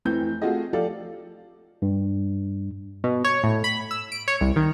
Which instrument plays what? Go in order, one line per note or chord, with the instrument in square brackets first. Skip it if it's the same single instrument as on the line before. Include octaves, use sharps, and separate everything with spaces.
[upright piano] F1 E3 C4 G6
A3 C4 F4 F#4 G#4 D#5
F3 G4 A4 D5 F5
[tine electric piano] G2
[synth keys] B2
C#5
A2
B5
E6
D7
C#5
C2
D#3